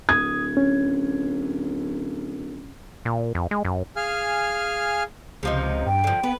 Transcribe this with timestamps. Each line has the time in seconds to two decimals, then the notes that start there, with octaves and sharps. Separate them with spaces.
0.09 D1 D#6 G#6
0.57 C#4
3.05 A#2
3.35 F2
3.51 G#3
3.65 F#2
3.96 G#4 F5 G#5 F6
5.43 C#2 C3 F3 D#4
5.87 G2 G5
6.04 D3 F3
6.23 B3 B4